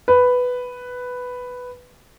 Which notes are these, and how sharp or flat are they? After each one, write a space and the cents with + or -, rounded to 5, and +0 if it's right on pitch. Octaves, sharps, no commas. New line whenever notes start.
B4 +5